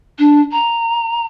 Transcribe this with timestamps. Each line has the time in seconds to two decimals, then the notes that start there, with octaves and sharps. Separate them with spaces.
0.19 D4
0.52 A#5